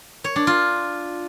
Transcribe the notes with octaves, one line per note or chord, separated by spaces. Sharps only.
C#5
D4
F4